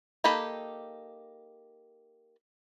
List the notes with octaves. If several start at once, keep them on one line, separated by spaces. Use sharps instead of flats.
A#3 D#4 G4 A4 B5